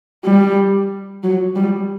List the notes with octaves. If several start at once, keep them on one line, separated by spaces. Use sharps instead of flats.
G3
F#3
G3